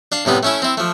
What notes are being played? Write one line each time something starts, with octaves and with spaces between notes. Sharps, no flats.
D4 F5
A2 C3 G3 B3
A3 C#4 E4
C4 E4
F3 A3